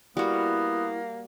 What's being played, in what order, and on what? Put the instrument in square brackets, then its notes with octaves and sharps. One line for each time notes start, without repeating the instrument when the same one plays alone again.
[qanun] G3 F#4 [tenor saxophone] A#3 [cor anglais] B3 [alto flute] E4